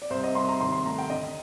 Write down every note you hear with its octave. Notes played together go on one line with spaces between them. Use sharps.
D5
C2 C5
D#5
C2 C6
A#5
D#2 C6
C6
A3 A#5
G5
D3 D#5